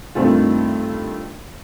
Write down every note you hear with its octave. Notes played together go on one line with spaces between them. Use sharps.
G2 D#3 A3 C4 F4